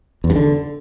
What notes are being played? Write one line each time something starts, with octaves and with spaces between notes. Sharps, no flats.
E2
G2
D3